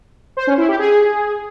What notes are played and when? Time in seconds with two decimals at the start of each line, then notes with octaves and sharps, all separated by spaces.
0.37 C5
0.47 C#4
0.58 E4
0.68 G4
0.79 G#4